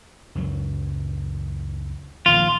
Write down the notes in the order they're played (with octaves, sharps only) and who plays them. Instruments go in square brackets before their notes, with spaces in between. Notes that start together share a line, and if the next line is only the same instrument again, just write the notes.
[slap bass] C#2 F#2 F#3
[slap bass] A#1 D#2 F3 [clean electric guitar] F4